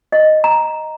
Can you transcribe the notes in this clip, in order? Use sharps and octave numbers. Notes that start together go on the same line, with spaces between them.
D#5
A#5